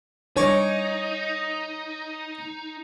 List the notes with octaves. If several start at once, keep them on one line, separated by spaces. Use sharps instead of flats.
G3 D4 D#4 C#5 G#5 C#6 D6